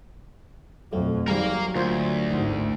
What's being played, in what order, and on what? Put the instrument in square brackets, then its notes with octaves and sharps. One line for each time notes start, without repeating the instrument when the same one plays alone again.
[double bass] F2 B2 [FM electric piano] F#3 A3 F#4
[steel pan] D#3 G3 [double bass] F#3 [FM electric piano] G#4 C5 [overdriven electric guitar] A#4 F5
[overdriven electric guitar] D2 [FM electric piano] A#3 G#6 [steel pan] F4 C5
[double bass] G#1 A2 [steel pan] D#3 F#4 C5